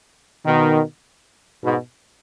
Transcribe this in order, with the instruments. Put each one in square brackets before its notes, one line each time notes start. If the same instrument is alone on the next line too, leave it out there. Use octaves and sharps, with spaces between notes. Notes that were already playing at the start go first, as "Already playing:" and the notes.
[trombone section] B2 D#3
G#2 B2